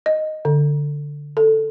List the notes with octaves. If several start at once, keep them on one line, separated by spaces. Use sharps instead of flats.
D#5
D3
A4